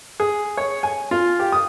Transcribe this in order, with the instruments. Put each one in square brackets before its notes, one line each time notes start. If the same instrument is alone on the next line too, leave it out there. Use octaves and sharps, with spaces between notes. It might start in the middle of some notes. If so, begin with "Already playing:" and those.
[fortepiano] G#4
C#5
G#5
F4
G4
D#6